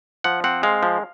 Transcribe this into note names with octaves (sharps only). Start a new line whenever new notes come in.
F3 F#5
C4 F#5
G#3 F5
F3